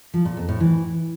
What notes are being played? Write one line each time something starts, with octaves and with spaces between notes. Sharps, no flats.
F3
A#2
F2
A2
E3